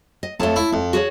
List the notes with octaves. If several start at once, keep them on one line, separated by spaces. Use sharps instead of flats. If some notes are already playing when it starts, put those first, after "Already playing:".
D#5
F2 A3 C#5 A5
E4
F2
F#4 G#4 C#5